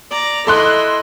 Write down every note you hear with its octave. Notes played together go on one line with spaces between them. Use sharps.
D5 A#5
E4 A4 D#5 C6 F#6